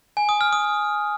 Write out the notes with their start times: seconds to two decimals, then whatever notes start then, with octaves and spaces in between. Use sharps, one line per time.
0.17 G#5
0.29 D#6
0.41 F6
0.53 D#6